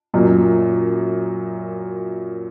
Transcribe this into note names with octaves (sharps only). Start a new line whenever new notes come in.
F#2 A#2